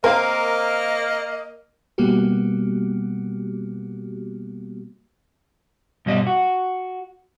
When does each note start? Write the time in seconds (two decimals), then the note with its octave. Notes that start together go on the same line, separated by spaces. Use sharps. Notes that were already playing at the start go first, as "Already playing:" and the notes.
0.04 A#3 C4 A#4 D#5 F5
1.98 B2 G3 A#3 B3 F#4 G4
6.06 G2 B2 G3 D#5
6.27 F#4